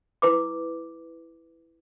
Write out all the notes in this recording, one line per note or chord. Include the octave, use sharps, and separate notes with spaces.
E4 B4 D6